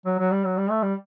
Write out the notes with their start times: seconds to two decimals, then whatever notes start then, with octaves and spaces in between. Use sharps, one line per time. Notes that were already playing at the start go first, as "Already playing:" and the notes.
0.06 F#3
0.19 F#3
0.31 G3
0.45 F#3
0.57 G3
0.70 A3
0.82 G3